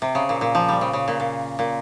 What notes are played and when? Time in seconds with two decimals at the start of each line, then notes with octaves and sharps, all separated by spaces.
0.02 C3
0.15 C#3
0.29 A#2
0.41 A#2
0.55 F3
0.68 G3
0.81 C#3
0.93 C#3
1.08 A#2
1.20 A#2
1.59 A#2